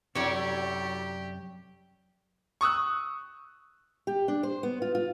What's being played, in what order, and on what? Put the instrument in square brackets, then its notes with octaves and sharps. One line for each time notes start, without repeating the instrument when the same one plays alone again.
[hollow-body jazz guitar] F#2 C3 [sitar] F#3 A3 E4 [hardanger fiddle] G4 [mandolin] C#5 D5
[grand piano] C#6 D#6 E6 F#6
[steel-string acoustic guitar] G4
D4
C5
B3
F4
F4